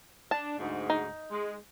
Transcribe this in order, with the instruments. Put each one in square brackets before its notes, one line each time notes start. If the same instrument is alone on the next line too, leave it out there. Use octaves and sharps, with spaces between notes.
[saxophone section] D4 [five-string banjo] A5
[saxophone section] D2 G#2
[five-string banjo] D#4
[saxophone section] G#3